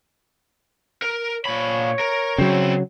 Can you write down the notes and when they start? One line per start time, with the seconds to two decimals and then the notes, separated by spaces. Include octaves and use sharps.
1.02 A#4
1.46 A#2 C#5 B5
2.00 A#4
2.38 C#3 F#3 C4 E4